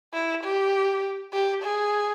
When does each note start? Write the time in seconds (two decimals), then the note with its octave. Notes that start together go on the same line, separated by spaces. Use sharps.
0.14 E4
0.44 G4
1.33 G4
1.62 G#4